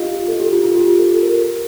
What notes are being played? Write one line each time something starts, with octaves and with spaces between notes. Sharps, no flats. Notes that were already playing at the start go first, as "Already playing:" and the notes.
Already playing: F4 G4 D#5 F5
A4
G4
F4
F4
G4
A4
A#4